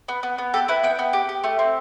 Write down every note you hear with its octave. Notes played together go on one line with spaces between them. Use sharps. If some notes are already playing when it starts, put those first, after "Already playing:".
B3
B3
B3
G4 A4
E4 B4
B3 G5
B3
G4
G4
A3
C4